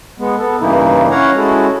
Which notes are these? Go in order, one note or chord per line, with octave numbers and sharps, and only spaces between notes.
G#3 B3
B3 A4
G2 C#3 E3 A#3 D#4 E4
C#4 E4 C#5 F5 F#5 A#5
G#3 C#4 E4 F#4 A4